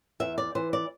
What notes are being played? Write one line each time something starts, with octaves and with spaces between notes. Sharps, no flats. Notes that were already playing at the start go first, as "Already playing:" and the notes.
E2 E5
D5
E3 C5
D5